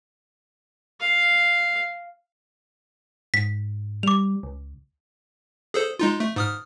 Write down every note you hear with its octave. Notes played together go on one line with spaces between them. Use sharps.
F5
G#2 B6
G3 D6 F7
C#2
G#4 A4 C5
G#3 D#4 F4
A3
G#2 D#6 F6